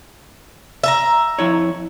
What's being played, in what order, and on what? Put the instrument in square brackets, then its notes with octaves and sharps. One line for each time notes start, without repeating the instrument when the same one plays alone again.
[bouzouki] E5 A5 A#5
[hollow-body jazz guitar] F2 E4 C#5